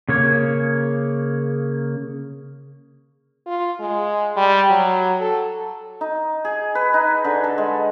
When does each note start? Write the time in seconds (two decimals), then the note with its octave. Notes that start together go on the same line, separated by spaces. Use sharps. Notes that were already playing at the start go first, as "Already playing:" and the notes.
0.09 C#3 A#3 C#5
3.47 F4
3.80 G#3
4.37 G3
4.70 F#3
5.21 A4
6.01 D#4
6.45 G#4
6.75 B4
6.94 D#4
7.25 D3
7.44 A4
7.58 G#3